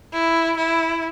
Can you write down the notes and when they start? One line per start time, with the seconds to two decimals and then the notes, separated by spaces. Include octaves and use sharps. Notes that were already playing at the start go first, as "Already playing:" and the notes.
0.13 E4
0.57 E4